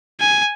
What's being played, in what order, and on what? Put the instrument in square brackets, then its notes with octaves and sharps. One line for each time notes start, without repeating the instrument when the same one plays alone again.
[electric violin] G#5